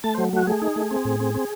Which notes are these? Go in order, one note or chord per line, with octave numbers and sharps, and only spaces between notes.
A3 A5
F#3 C5
A3 F#4
A3 G#4
D#4
A3
C4
A2
C4
C4